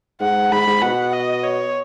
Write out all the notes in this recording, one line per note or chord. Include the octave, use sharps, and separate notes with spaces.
G#2 F#5
G#2 B5
G#2
B2 F#5
D#5
C#5